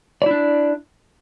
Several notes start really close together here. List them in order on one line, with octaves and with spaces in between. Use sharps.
D5 E4 D4